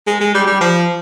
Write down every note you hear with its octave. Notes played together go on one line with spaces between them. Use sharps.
G#3
G#3
G3
G3
F3